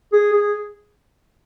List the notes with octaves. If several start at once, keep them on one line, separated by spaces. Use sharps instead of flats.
G#4
G#4